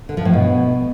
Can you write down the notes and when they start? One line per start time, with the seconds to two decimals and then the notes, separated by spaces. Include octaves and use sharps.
0.09 D3
0.17 F3
0.25 A2
0.33 B2